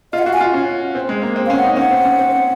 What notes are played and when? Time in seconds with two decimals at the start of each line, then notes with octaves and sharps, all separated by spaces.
0.13 F4 D#5
0.18 F#5
0.23 F5
0.26 F#4
0.33 G#5
0.41 F4
0.54 C#4
0.95 C4
1.09 G#3
1.22 A#3
1.36 C4
1.46 C#4 F5
1.57 F#5
1.63 D#4
1.77 C#4 F#5
1.91 C4
2.05 C#4
2.19 C4